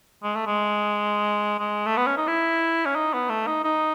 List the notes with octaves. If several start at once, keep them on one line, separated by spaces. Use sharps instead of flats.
G#3
A3
G#3
G#3
A3
B3
C#4
D#4
E4
C#4
D#4
B3
A3
D#4
D#4